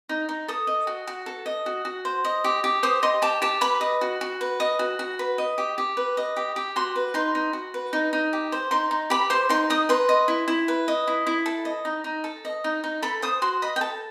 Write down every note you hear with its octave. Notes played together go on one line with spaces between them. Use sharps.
D#4
D#4
A4 D#6
D#5
F#4
F#4
A4
D#5
F#4
F#4
C5
D#5
G4
G4
C5 D#6
D#5 C6
G4 A5
G4 A5
B4 B5
D#5
F#4
F#4
B4
D#5
F#4
F#4
B4
D#5
G4
G4
B4
D#5
G4
G4
F#4 C6
B4
D#4 C6
D#4
F#4
B4
D#4
D#4
G4
C5
D#4 C6
D#4
G4 B5
C5 C6
D#4 C6
D#4 D#6
B4 C6
D#5
E4
E4
B4
D#5
E4
E4
A4
D#5
D#4
D#4
A4
D#5
D#4
D#4
A4 B5
C5 D#6
F#4 C6
D#5 B5
G5
A4 A5